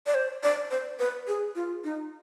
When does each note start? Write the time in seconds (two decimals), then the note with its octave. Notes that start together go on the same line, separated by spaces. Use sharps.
0.07 D5
0.15 C5
0.43 D5
0.71 C5
0.99 B4
1.28 G#4
1.55 F4
1.84 D#4